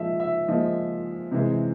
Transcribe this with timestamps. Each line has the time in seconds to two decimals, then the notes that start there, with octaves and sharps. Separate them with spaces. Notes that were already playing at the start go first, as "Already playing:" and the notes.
Already playing: A#2 F3 G#3 D#5 E5
0.20 E5
0.47 A#2 F3 G#3 D#5
1.31 C3 E3 G#3